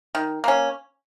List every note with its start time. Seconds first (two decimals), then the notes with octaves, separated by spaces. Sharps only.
0.15 D#3
0.44 A#3 C#4